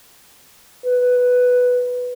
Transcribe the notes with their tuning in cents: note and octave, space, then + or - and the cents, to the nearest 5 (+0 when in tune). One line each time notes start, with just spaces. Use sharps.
B4 +5